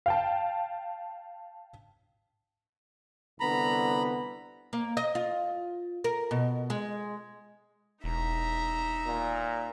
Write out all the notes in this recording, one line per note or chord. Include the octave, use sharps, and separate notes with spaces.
F5 G5 A5
C2 D3 B3 A#5 B5
A#3
D#5
F4
A#4
B2
G#3
E1 D#4 E5 A#5
A#2